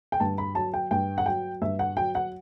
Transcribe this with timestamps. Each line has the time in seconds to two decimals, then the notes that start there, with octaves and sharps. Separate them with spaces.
0.12 G5
0.20 G2 A5
0.38 B5
0.55 F#3 A5
0.74 G5
0.91 G2 G5
1.18 F#5
1.26 F#3 G5
1.62 G2 E5
1.79 F#5
1.97 F#3 G5
2.15 F#5